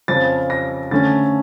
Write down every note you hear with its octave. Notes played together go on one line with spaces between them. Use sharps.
F2 C#3 F3 A6
A#6
D3 A3 C#4 A6